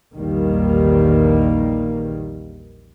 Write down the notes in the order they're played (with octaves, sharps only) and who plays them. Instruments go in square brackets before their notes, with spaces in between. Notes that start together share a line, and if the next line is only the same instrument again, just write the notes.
[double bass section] A#1 E2 D#3 G3 A#3